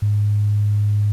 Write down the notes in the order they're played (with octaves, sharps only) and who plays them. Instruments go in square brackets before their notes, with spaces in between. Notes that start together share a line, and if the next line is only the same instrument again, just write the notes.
[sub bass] G#2